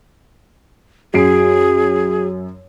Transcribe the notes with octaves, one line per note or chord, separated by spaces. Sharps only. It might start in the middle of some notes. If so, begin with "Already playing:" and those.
F#2 F#4 G#4 C7 D7